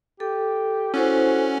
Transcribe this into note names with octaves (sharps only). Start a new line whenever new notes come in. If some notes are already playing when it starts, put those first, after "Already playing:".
G4 A4
C#4 E4 F#4 A4 C5